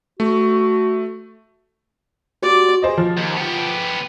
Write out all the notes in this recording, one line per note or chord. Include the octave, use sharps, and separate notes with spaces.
A3 F#4
F#4 G4 D5
G#4 C5 D#5
F3
D#2
B3 G4